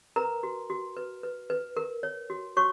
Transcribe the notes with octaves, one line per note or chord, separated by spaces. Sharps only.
A#4 B4 A#5
F#4
F#4
B4
B4
B4
A#4
C#5
F#4
F#4 C#5 C#6